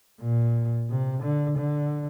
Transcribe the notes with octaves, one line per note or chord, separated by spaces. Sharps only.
A#2
C3
D3
D3